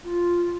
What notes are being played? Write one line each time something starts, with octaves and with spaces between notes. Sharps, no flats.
F4